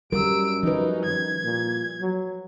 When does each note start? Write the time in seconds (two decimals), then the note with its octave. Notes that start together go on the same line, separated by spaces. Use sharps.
0.13 F#2 G3 A#4 E6 D7
0.63 F3 C#4 D#4 B4
1.05 D#3 G#6
1.44 A#2
2.01 F#3